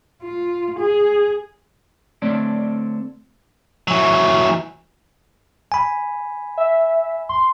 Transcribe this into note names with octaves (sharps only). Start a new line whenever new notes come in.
F4
G#4
D3 A3 C4 D4 C#5 D5
E3 F#3
G#5 B5
E5
C6